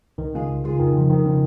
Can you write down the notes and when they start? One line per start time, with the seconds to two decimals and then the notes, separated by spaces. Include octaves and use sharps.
0.18 C#2 D#3
0.34 C#3 G#3 F4 G#4
0.49 C#2
0.64 C#3 G#3 F4 G#4
0.79 F2 D#3
0.95 C#3 F3
1.09 F2 D#3
1.25 C#3 F3